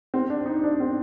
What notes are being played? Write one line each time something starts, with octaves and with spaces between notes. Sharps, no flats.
C4
D4
D#4
D4
C4